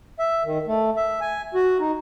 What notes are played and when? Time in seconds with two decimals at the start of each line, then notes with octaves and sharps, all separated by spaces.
0.19 E5
0.44 D#3
0.67 A3
0.96 E5
1.21 G#5
1.54 F#4
1.80 D#4